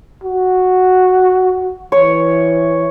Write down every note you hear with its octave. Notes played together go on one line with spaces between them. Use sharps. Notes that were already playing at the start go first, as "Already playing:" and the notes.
F#4
E3 C#5